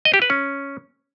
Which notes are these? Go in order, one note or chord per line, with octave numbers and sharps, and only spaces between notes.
D#5
G4
B4
C#4